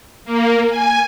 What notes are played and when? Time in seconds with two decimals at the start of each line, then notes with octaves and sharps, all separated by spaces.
0.25 A#3
0.70 G#5